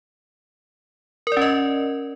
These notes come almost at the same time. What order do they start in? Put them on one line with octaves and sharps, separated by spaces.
A#4 D5 C#4 D#5